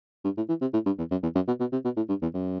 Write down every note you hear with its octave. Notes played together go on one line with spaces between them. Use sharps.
G2
A2
E3
C3
A2
G2
E2
F#2
E2
F#2
B2
B2
C3
B2
A2
G2
E2
F#2